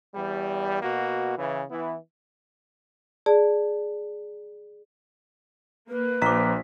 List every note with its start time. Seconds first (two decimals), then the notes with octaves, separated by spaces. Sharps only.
0.15 E2 G3
0.82 B2 A#3 F#4
1.38 C#3 E3
1.70 E3 B3 E4
3.26 G#4 D5 A5
5.89 A#3 B4
6.22 A#1 F3 A#3 A#5 D6 B6